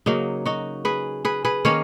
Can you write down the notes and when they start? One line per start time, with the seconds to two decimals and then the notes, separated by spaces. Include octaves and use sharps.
0.06 C#3 F#3 A#3 D#4
0.46 D#4 F#4
0.85 G#4 B4
1.25 G#4 B4
1.45 G#4 B4
1.65 D#3 A#3 C#4 C#5 F5